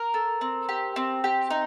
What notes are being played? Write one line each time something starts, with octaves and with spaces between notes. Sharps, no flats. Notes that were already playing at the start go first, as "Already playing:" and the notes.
Already playing: A#4
A4
C4
G4
C4
G4
D#4